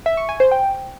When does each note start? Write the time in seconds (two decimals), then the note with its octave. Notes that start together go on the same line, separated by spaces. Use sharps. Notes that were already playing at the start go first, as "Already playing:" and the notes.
0.06 E5
0.17 C#6
0.29 G#5
0.40 C5
0.51 G5